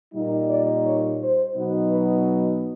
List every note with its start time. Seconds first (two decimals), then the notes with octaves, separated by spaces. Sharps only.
0.14 A#2 G3 A#3 D#4
0.51 D5
0.86 C#5
1.21 C5
1.56 B2 F#3 B3 D#4
1.91 B4